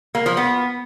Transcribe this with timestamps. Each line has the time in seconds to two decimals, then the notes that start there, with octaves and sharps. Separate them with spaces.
0.15 A#3
0.26 F3
0.37 B3